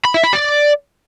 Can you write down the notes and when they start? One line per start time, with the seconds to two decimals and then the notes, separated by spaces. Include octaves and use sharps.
0.05 B5
0.14 E5
0.24 B5
0.33 D5